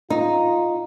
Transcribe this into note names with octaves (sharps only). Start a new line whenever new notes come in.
D#4 F4